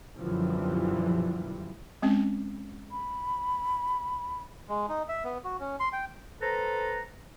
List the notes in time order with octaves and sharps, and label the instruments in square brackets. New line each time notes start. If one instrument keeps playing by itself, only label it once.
[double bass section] F#2 B2 D3 E3 F3 G3
[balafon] G#3 C4 C#4
[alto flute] B5
[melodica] G#3
D#4
E5
B3
F#4
C#4
C6
G5
[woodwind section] A4 B4 C5 A#5